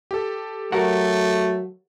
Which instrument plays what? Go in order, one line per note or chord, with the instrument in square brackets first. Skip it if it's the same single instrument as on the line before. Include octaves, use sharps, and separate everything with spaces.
[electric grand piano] G4 A4
[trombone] F#3 [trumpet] A3 [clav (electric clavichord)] F#4 A#4 F#5